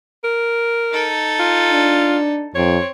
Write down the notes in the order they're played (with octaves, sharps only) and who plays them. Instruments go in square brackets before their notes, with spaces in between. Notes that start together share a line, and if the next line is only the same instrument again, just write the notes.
[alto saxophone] A#4
[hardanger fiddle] D#4 A4
[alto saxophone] F4
[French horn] D4
[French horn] F2 [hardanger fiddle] C4 [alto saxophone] C#5